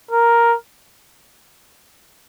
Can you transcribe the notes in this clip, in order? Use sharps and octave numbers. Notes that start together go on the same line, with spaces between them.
A#4